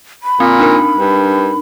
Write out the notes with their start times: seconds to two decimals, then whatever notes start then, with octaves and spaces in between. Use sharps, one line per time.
0.23 B5
0.40 A#2 C4
0.59 D4 D#4 A#4
0.98 G2